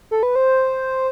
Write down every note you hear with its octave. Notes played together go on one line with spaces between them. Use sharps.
A4
B4
C5